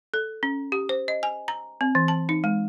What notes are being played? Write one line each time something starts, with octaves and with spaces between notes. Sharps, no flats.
A4
C#4
G4
C5
D#5
G#5
A#5
C4
E3
A5
D#4
G#3